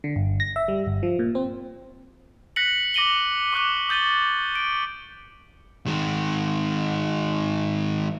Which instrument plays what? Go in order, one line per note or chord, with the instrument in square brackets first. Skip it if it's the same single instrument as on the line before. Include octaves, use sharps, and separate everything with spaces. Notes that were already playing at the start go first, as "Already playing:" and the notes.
[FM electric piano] D3
G1
A#6
E5
G3
G1
F3
A#2
C4
[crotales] F#6 A#6 B6 C#7 F#7
D6 A#6 C#7 D#7 F#7 G7
C#6 D6 F#6 D#7
D#6 G6 A6 D#7 G7
D7
[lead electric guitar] D#3 G#3